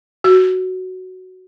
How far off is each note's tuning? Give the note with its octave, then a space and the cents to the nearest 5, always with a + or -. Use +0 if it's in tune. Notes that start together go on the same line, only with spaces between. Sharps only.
F#4 +5